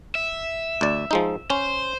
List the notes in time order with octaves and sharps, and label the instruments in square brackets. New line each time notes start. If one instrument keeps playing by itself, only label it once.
[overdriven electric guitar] E5
[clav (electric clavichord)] D2 D5
F3 G#3 D#4
[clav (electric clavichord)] C#4 [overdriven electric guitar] C5